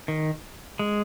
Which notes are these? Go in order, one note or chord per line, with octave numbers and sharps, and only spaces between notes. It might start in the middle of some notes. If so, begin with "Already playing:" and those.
D#3
G#3